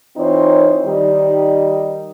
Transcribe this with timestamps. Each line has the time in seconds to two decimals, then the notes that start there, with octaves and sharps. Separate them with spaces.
0.17 E3 C4 D#4 F4 C5 C#5
0.85 D#3 G3 D#4